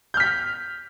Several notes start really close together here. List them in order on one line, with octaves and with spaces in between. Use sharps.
G6 F6 B6